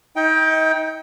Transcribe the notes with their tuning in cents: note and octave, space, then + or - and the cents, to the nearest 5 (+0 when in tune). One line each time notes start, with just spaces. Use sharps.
D#4 +35 G5 +0